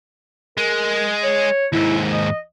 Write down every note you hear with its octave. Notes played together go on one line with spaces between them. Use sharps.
G#3 A#4
C#5
D#2 G#2 E4
D#5